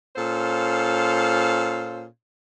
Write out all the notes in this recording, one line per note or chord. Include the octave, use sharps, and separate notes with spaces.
A#2 C#4 A4 C5 F5